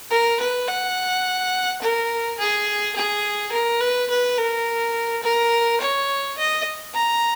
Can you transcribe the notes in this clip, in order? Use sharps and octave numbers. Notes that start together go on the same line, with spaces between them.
A#4
B4
F#5
A#4
G#4
G#4
A#4
B4
B4
A#4
A#4
C#5
D#5
A#5